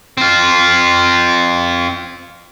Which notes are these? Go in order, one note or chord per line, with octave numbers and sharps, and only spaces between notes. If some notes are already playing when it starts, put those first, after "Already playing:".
C4 F4